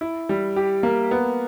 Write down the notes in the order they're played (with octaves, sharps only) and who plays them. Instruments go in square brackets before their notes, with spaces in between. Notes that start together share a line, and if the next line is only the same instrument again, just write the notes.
[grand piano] E4
G3
G4
A#3
B3